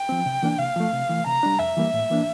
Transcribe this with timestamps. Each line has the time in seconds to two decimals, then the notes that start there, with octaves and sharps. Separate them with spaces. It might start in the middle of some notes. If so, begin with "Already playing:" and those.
Already playing: G5
0.09 F3 C4
0.26 C3
0.43 E3 A#3 D4
0.59 C3 F5
0.76 F3 A3
0.93 C3
1.09 E3 A3
1.26 C3 A#5
1.43 G3 D4
1.59 F2 E5
1.77 E3 G3 A#3
1.93 A2
2.10 E3 A#3 D4